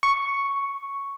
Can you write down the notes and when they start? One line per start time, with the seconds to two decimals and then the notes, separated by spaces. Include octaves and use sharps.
0.03 C#6